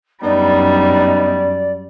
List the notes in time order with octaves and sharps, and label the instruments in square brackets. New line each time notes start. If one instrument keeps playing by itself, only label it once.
[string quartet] F#2 G3 [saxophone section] B3 D4 D#4 [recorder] D5